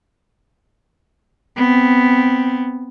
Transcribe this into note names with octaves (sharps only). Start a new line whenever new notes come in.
B3 C4